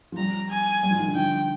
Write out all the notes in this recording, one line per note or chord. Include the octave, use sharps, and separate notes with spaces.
F3
G3 A#5
G#5
G3
F3
D#3
D3
D#3 G5